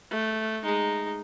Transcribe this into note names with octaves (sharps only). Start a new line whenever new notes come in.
A3
G#3 D#4